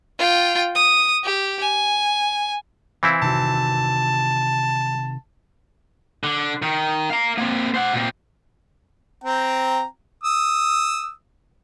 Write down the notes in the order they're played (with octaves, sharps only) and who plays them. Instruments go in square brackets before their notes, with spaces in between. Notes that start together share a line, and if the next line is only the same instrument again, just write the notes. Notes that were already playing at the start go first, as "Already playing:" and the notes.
[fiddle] F4 G5
D#6
G4
G#5
[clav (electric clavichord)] E3 C4 E4 [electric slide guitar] F5 G#5
[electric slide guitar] C3 D#3 F#4 [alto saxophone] A5
[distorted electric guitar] D3
D#3
F5 A#5
A#3 C4
C5 F#5
A#2 C4
[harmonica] C4 G5 A#5
D#6 E6